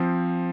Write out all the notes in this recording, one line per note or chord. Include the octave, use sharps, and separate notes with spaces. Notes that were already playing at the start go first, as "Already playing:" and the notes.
Already playing: F3 C4